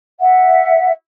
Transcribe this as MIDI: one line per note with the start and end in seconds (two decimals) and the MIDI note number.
0.20 0.91 76
0.20 0.91 78